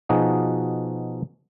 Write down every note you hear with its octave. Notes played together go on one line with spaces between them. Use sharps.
B2 F3 D#4 F#4 G#4